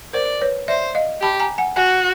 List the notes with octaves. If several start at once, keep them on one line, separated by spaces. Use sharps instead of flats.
A#4 C5 D5
B4 C#5
C5 D5 E5
D#5 F5
G4 A5 B5
G#5 A#5
F#5 G#5
F#4 F#5 G#5